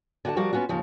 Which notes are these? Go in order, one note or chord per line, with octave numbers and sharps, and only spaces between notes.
D3 F#4 F#5 A5
F3 G3 F#4 A#4 D5 F5
B3 C#4 F4 F#4
D#2 C#3 F3 G4